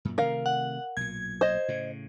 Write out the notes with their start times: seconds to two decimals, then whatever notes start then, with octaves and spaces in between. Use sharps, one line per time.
0.05 F#2 A#2
0.18 C3 D#3 A3 A#4 F5
0.46 F#5
0.97 B1 A#2 G#6
1.41 C5 D#5
1.68 A2 C#3